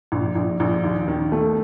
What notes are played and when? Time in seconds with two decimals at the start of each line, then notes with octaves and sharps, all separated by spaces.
0.12 A#1
0.35 A#1
0.60 A#1
0.84 D#2
1.08 D#3
1.32 A3